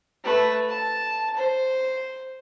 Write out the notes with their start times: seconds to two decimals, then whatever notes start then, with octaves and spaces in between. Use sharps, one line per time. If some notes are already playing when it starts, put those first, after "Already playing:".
0.24 A3 B4
0.69 A5
1.37 C5